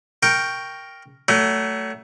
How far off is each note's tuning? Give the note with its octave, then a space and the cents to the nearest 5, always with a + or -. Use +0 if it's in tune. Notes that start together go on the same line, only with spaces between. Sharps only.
A#4 +0 G5 +0 C#6 +0
F#3 +35 A3 +15